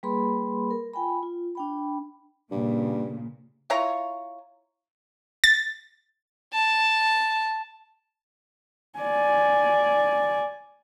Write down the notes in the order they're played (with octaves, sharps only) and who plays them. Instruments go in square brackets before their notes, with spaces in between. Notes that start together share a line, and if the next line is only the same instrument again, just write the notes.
[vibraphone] G3 A#3 G#4 B4 B5 C6
A#4
F4 G5 G#5 B5
F4
D4 G5 B5
[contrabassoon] G2 [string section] A#2 [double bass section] C#3
[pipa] E4 F4 C#5 A#5
[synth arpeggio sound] A6
[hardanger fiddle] A5
[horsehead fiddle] D5 G#5